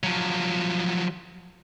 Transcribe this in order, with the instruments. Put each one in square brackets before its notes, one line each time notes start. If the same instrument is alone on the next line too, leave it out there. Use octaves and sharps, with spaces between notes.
[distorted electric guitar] F3 F#3